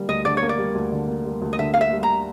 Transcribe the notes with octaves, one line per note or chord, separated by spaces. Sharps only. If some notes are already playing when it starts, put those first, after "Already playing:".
Already playing: D3 G3 A#3
D2 D#5
D3 D5
C#5
A#3
D5
G3
D2
D3
A#3
G3
D2
D#5
D3 E5
A#3 F5
E5
G3
A#5